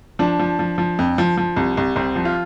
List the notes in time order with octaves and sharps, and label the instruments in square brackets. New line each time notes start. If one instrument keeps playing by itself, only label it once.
[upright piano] F3 D4
F3
F3
F3
F2
F3
F3
C2
C2
C2 C4
F3
F4